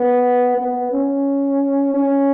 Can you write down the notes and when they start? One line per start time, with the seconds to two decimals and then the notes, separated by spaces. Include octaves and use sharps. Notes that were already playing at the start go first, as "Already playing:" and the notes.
Already playing: B3
0.58 B3
0.92 C#4
1.94 C#4